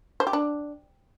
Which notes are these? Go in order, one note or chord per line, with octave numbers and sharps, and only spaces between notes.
C5
G4
D4